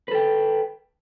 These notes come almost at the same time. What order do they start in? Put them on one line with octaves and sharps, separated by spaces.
B4 A4 G5